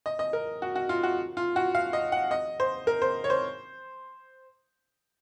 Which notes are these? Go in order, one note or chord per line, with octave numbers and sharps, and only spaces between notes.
D#5
D#5
A#4
F#4
F#4
F4
F#4
F4
F#4
F5
D#5
F#5
D#5
C5
A#4
C5
C#5
C5